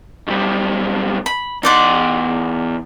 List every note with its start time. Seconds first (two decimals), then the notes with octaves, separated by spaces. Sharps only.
0.28 B1 G3
1.26 B5
1.63 E2 D#4 D5 F#5 C6